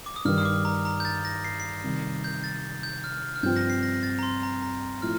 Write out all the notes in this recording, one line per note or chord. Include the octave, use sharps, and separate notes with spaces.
D6
D#6
G2 D#3 G3 F6
D#6
D6
A#5
A#5
G6
A6
A#6
C7
C7
C3 D#3 G3
G6
A6
G6
F6
F6
G2 F3 C4 G6
A#6
C7
A#6
A#6
A6
A#5
C6
A#5
A#5
A2 F3 F6